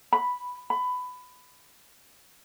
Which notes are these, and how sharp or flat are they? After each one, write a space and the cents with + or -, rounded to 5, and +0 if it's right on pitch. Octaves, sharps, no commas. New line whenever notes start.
B5 +0
B5 +15